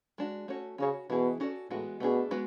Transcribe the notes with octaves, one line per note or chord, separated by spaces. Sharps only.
G#3 D4 F#4
A3 C#4 F#4 C#5
C#3 C#4 F#4 C#5
B2 E3 B3 E4 G#4
C#4 F#4 A4 D5
A2 E3 G#3 B3 F#4
B2 A3 D4 G#4
G#3 B3 F#4 B4